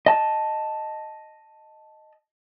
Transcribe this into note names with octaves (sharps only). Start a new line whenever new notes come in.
D#5 A5